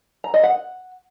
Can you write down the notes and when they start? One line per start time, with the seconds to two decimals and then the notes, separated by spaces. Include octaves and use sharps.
0.24 A#5
0.34 D#5
0.44 F#5